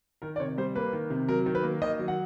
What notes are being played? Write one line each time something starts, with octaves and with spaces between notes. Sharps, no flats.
D#3 A#4
D5
C3 C#5
G3 C5
A#3 B4
D#3
C3
F#3 A#4
D#3
B4
A#3
D#3 D#5
F#3
F#5